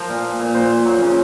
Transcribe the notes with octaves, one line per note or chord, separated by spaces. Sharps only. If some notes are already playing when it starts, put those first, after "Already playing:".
Already playing: F3 A#4 C5
A#2
A#2
A#2
A#2 C5
A#2
F#3
C#3